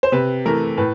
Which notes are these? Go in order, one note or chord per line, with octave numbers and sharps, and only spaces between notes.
C5
C3 B4
E3 A3 A#4
A2 B4